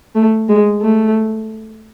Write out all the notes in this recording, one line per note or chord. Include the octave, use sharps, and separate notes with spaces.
A3
G#3
A3